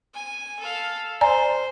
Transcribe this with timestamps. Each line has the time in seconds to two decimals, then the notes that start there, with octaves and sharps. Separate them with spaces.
0.14 G#5
0.60 A4 F5
1.21 C5 D5 G#5 A#5